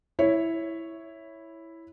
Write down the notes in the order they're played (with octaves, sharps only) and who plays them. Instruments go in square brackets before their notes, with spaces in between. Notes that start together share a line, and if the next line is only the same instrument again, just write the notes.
[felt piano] E4 C#5